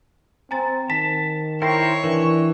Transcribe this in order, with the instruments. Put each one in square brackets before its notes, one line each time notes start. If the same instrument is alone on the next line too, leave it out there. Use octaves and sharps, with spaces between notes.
[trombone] C4 [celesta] G#5 A#5 A6
[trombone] D#3 [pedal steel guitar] A5 [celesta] B6
[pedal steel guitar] E4 A#4 C5 [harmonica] C#5 C#6 [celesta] G5 A#6 C7
[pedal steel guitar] E3 [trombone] D4 [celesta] A#4